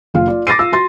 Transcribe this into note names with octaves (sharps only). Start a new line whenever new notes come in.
F#1 F4 F5
F4 D5
D6 A6 A#6 C7 D#7
F4 E6
F#4 C6 A6